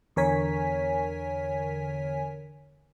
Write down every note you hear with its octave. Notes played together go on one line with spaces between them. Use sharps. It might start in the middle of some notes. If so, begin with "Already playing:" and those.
E2 D3 A#4 C#5 G#5 B6